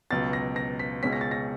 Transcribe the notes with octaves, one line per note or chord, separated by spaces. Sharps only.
C#2 B2 F#3 B3 A6
A#6
A#6
B6
C#2 B2 G#3 C#4 B6
A#6
A6
A#6